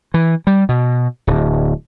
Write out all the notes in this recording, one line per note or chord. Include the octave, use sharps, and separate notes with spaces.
E3
G3
B2
D1